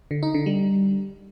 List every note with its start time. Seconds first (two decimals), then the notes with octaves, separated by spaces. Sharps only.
0.11 D3
0.23 D#4
0.34 D3
0.46 G3